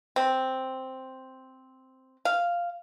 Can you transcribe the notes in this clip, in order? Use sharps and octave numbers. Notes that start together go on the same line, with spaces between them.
C4
F5